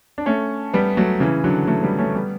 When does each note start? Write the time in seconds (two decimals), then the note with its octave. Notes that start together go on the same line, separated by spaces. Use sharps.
0.18 D4
0.26 A3 C#4
0.74 G3 B3
0.97 F#3 A3
1.20 C#3 E3
1.44 D3 F#3
1.67 F#3 A3
1.83 G3 B3
1.98 A3 C#4
2.14 G3 B3